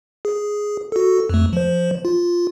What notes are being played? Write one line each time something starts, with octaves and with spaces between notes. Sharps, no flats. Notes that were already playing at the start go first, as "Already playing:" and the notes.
G#4
F#4 A4
F2 A3
F3 C5
F4